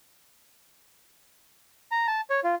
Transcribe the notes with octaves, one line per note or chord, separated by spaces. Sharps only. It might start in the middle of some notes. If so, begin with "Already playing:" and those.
A#5
A5
C#5
F4